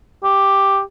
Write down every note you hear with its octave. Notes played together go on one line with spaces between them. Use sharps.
G4